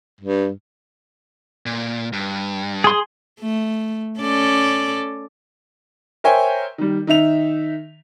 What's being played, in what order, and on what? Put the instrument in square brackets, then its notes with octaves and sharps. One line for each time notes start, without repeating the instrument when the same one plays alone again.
[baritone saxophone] G2
[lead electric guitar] A#2
G2
[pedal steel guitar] G#4 C6
[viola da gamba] A3
C#4 A4 D5
[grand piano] A#4 C5 C#5 E5 G5 G#5
D#3 G3
D#3 D#4 E5 F7